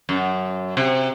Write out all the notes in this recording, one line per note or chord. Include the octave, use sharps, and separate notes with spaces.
F#2
C3